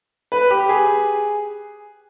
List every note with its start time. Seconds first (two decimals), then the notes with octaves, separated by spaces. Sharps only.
0.32 B4
0.50 G4
0.69 G#4